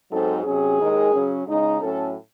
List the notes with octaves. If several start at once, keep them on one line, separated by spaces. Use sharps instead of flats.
G#2 F#3 C4 D#4 A4
C3 F#3 C#4 G#4
D#2 D#3 G#3 D#4
C#3 F#3 C#4
C#3 G#3 D#4
A2 F#3 C#4 A4